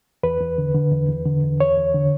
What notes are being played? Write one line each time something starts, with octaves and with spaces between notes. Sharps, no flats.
E2 B4
E2
D3
D3
E2
E2
D3
E2
E2 C#5
E2
D3